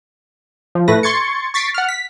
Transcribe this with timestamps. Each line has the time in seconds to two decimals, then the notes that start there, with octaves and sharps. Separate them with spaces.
0.75 F3
0.88 A2 A3 B4 A#6
1.03 C6 C#6 G#6 A6 C#7
1.54 C#6 A6 B6 C7 D7
1.74 F#5 F6
1.89 B6